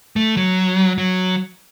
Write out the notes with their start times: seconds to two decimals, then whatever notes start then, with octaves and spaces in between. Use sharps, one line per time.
0.16 A3
0.37 F#3
0.98 F#3